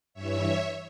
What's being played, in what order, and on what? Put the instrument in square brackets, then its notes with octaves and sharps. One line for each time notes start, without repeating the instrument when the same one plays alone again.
[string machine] G2 E3 C#5 E5